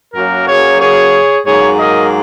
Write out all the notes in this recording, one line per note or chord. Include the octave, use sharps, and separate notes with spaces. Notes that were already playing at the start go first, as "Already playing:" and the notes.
F#2 F#3 A#3 F#4 A#4
G#4 C#5
G#4 C#5
G#2 F#3 A#3 G#4 C#5
A#4 D#5